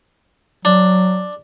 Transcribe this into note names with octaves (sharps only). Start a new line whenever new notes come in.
F#3 D4